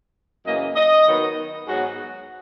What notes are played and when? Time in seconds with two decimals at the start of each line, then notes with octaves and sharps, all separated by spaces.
0.46 F#2 C#3 E3 A#3 C#4 D#5
0.76 D#5
1.07 D#3 F#3 B3
1.67 G#2 F#3 B3 F#4